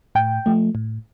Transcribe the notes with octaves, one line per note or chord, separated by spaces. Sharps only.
A2 G5
F3 A3
A2